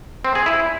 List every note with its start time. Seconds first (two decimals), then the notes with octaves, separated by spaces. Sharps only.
0.25 C4
0.35 G#4
0.46 E4